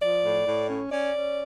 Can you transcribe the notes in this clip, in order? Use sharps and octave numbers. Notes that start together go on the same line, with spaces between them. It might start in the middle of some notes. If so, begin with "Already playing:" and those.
F3 D5
A2
A2
C#4
C#4 D5
C#4